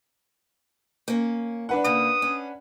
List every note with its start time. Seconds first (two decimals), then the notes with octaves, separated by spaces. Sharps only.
1.08 A#3 C#4
1.69 D4 B4 F#5
1.84 C#3 A#3 D#6
2.22 C#4